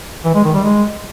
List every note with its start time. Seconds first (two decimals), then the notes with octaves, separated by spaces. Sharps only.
0.25 E3
0.35 G#3
0.44 D#3
0.54 G3
0.64 G#3